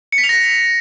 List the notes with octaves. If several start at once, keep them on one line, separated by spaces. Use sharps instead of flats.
C#7
B6
F7
A#6